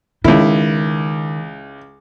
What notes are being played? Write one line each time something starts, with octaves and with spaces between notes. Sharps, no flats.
C#2 D#3 E4